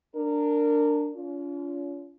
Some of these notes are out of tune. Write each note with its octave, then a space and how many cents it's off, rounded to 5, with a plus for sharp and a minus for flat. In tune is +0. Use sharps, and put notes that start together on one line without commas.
D4 +0 A#4 -20
C#4 +40 F4 -15